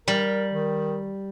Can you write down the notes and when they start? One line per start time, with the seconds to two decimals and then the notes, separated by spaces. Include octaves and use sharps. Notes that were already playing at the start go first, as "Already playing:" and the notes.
0.08 G3 A#4
0.49 D#3